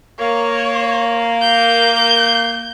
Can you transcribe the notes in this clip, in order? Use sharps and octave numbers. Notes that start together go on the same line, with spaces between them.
A#3 C#5
G6